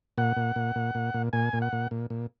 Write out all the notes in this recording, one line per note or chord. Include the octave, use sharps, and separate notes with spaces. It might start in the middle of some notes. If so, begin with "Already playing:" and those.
A#2 F#5
A#2
A#2
A#2
A#2
A#2
A#2 G#5
A#2
F#5
A#2
A#2
A#2